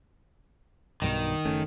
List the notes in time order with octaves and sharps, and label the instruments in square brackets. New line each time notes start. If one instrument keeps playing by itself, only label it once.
[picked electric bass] B1 G2 B2 [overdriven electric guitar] D#3
[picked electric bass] F#1 A3 C#4